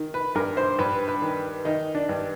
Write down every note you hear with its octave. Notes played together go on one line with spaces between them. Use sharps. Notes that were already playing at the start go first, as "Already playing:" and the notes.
Already playing: D#3
B4
G2 A#4
C5
G2 B4
B4
D#3
D#3 D#4
D4
G2